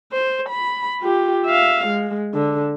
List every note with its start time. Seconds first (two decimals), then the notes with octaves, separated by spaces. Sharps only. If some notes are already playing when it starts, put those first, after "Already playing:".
0.12 C5
0.49 B5
1.01 F4 G4
1.46 E5 F5
1.87 G#3
2.34 D3